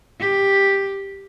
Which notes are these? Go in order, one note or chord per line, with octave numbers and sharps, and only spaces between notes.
G4